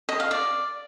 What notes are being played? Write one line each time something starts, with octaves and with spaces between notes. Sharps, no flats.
D#5
F5
D5